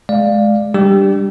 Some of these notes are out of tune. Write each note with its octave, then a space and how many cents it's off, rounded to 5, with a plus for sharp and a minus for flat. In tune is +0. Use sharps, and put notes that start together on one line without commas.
G#3 +25 D5 +15 F5 +0
G3 +0 D4 +0 G4 +0